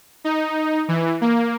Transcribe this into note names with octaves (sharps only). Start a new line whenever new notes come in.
D#4
E3
A#3